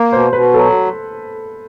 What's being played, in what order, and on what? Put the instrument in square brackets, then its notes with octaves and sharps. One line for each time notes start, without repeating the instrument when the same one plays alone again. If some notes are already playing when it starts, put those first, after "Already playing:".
Already playing: [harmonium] A#3
[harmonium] B2 [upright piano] C5
[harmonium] B2 [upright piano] B4
[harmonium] F#3 [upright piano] A4